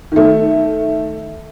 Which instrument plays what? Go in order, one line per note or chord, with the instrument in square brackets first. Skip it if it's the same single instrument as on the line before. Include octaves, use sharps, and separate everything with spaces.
[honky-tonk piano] D#3 A3